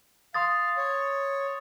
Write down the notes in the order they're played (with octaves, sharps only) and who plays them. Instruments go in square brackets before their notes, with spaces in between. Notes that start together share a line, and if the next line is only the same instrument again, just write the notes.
[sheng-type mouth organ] F5 [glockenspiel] C6 D#6 A6
[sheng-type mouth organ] C#5